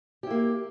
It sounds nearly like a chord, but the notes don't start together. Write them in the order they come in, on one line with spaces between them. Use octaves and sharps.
G4 E4 A#3